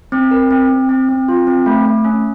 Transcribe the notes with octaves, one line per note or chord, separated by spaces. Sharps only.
C4
A#4
C4
C4
C4
C4
F4
C4
A3
A3
C#4